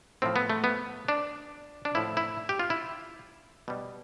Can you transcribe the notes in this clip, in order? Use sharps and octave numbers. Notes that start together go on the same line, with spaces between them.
A2 F3 C4
B3
A3
B3
D4
D4
A2 F3 E4
E4
G4
F4
E4
B2 G3